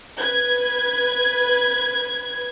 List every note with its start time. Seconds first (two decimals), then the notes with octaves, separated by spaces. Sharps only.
0.18 B4 G#6